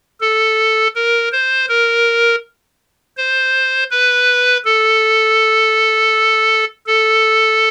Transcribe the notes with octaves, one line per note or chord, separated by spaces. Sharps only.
A4
A#4
C5
A#4
C5
B4
A4
A4